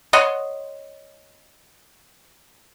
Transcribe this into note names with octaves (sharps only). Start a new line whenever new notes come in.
C#5 D#5 F#5 C6